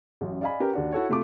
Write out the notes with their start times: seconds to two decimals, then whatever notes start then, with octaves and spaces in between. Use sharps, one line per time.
0.21 A1 F#2
0.41 D5 D#5 F5 G#5 B5
0.60 C#4 G4 A#4 B4
0.73 D#2 D4 F#4
0.92 E4 F#4 A4 C#5
1.09 C3 A3 F4 D6